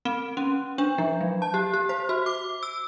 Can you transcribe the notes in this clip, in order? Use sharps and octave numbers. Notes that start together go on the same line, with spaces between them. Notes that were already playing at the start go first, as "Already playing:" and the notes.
C4
C#4
D4
F3
F#3
A5
G4
G4
C5
F#4
D6
E6